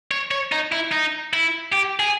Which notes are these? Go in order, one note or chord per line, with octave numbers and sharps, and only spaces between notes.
C#5
C#5
D#4
E4
D#4
E4
G4
G#4